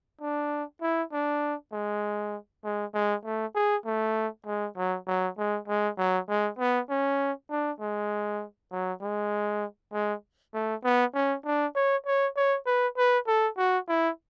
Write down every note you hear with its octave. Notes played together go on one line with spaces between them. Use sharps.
D4
E4
D4
G#3
G#3
G#3
A3
G#4
A3
G#3
F#3
F#3
G#3
G#3
F#3
G#3
B3
C#4
D4
G#3
F#3
G#3
G#3
A3
B3
C#4
D4
C#5
C#5
C#5
B4
B4
A4
F#4
E4